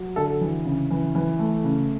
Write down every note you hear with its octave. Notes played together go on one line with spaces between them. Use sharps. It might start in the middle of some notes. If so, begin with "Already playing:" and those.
Already playing: F#3
D3 A4
E3
C#3
E3
E3
A3
C#3